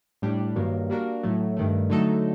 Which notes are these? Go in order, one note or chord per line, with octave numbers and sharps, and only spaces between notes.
A2 G3 D4 G4
G2 D#3 F#3 A#3
G3 A#3 D4 F#4 A#4
A2 F#3 A3
G2 D#3 A3
D3 F#3 A3 D#4 A4